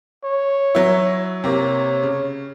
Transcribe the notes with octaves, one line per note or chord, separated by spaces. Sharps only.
C#5
F#3 E4
C3 A#3 C#5
C#3